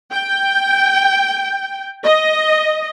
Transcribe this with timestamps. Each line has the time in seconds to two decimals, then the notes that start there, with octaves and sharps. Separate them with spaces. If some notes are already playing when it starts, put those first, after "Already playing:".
0.12 G5
2.04 D#5